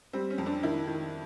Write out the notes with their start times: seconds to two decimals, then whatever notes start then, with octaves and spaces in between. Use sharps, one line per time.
0.13 G3 C4
0.30 C#4
0.38 F2
0.46 C4 D4
0.63 D#3 D4 E4
0.87 D#3